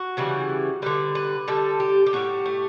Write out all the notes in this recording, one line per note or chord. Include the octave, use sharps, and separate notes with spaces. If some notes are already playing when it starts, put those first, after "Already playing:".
Already playing: F#4
C#3 E3 G3
D3 G3 B4
B4
D3 G3 A4
G4
G4
A2 G3 F#4
A3